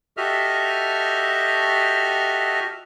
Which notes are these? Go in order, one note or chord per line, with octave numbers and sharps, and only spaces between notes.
F#4 G4 A4 D#5 E5 F6